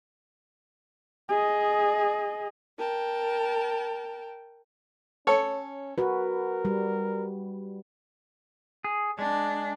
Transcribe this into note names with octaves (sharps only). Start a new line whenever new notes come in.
G#4 D#5
A#4 G5 A5
C#4 A4 C#5
F#4 A#4 B4
G3
G#4
G#3 D4